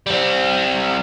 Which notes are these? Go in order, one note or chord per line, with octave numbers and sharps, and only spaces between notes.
G3 C4